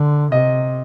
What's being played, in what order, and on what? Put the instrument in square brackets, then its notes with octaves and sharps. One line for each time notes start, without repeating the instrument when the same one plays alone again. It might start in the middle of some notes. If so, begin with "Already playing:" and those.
Already playing: [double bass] D3
[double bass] C3 [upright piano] D#5